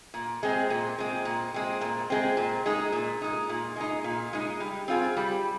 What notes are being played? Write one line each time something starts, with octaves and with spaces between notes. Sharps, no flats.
A#2
G#3 C4
A#2
G#3 C4
A#2
G#3 C4
A#2
G#3 C4
A#2
G#3 D#4
A#2
G#3 D#4
A#2
G#3 D#4
A#2
G#3 D#4
G3
C4 F4 G#4
G3